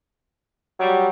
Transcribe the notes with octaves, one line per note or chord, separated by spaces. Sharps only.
F#3 G3